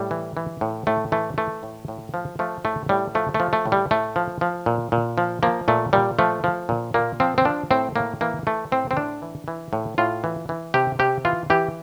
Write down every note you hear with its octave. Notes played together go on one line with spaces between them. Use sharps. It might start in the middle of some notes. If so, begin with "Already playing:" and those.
Already playing: A2 G3
E3
E3
A2
A2 A3
E3 A3
E3 A3
A2
A2
F3
F3 A3
A2 A3
A2 G3
F3 A3
A3
F3
A3
A2
G3
A2 A3
F3
F3
A#2
A#2
F3
F3 A#3
A#2 A3
A#2 G3
F3 A3
F3
A#2
A#2 A#3
F3 C4
C4
F3 D4
A2 C4
A2 A#3
E3 A#3
E3 A3
A2 C4
C4
A2 D4
E3
E3
A2
A2 F4
E3
E3
C3 G4
C3 G4
E3 F4
E3 G4